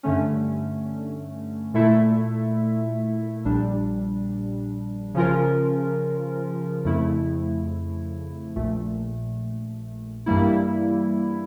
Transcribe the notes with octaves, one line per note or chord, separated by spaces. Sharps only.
G2 D3 A3 C#4
A#2 A3 E4 A4 E5
A#1 A#2 G3 D4
C#3 F3 C#4 F4 A#4
F2 C#3 F3 A3 E4
A#1 A#2 A3
G2 E3 G3 A#3 E4